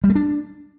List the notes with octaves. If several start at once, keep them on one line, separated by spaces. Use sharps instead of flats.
G3
A3
D4